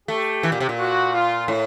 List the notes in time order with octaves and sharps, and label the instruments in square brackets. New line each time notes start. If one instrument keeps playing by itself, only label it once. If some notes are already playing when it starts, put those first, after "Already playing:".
[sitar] A3 [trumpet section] G4
[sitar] E3
A#2
C3
A#2
[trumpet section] F#4
F4
[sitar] A2